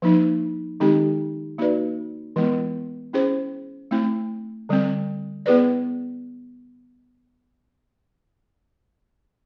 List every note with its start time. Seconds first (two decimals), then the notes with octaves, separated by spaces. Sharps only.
0.02 F3 A#3 D#4
0.80 D#3 G#3 C4 D#4 G4
1.58 A#3 D#4 F#4 B4 D5
2.36 E3 G#3 B3 E4
3.13 C#4 E4 G#4 C5
3.91 A3 C4 E4
4.69 D3 G3 C4
5.46 B3 E4 G#4 B4 D5